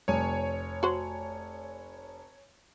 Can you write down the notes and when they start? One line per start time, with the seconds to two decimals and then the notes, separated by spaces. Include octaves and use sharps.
0.08 F1 C#5 G#5
0.83 F#4 C5